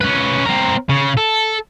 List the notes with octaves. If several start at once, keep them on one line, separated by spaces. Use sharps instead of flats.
C#4 B4
C4 A#4
C#3
A4